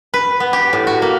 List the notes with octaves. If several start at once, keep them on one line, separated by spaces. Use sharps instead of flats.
B4
B3
G4
A2
F#4
A#3